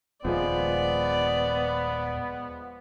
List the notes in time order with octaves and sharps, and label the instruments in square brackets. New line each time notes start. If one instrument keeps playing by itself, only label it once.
[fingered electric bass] D#1 [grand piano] F3 G#3 F4 [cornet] B3 [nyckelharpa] D5